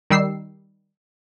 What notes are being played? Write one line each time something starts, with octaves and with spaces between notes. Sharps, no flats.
D#3 G3 E6 C7